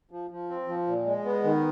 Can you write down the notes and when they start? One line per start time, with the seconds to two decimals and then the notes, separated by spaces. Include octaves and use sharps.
0.11 F3
0.30 F3
0.49 C4
0.68 F3
0.87 A#2
1.06 G#3
1.25 B3
1.44 D#3